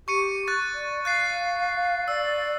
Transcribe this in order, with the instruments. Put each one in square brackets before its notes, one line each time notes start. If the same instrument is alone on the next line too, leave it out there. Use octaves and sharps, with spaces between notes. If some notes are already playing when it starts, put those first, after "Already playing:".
[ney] G4 [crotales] C#6 C#7 D#7
[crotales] C#6 F#6 A6
[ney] D5
[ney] F5 [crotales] F#6 A6 C7
[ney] D5 [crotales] E6